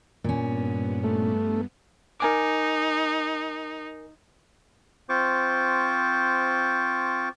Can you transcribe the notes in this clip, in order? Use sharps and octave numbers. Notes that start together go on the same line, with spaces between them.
G2 A#2 B3 C#4
A3
D#4 A#4 G#5 D6
C4 F4 C5 C#6 D6